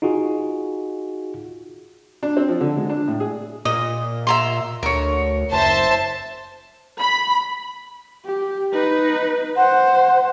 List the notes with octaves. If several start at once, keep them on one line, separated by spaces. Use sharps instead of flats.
D#4 F4 F#4 G#4
D4
C4
F3
D3
G#3
D4
A2
G#4
A#2 D#5
E5 A#5 C6
D2 A#4 C#5
F#1 C5 E5 A5
B5
G4
D#4 B4
C5 F#5